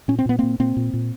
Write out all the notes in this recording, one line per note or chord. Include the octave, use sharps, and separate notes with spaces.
A#2 C#4
C4
A#2 B3
A#2 A#3 C4
A#2 A#3 C4
A#2
A#2